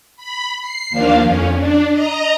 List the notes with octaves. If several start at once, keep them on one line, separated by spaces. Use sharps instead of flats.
B5
C7
D#2 F3 A#3 D4 F5
F2 C#4
D4
D#5 A#5